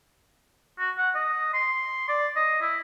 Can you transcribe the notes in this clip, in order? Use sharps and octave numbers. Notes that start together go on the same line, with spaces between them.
F#4
F#5
D#5
C6
D5
D#5
E4